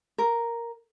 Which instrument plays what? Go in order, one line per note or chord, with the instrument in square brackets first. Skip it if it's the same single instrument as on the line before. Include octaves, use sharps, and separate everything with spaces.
[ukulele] A#4